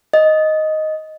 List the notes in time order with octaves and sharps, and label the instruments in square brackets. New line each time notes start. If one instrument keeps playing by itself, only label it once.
[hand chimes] D#5